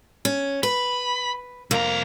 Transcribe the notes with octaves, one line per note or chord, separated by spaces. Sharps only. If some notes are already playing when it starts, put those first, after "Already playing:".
C#4
B4 B5
C2 F2 A#3 A#5